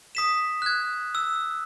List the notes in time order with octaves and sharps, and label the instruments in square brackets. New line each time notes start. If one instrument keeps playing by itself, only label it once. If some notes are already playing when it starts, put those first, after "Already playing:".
[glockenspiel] D#6 B6 E7
F#6 G#6
E6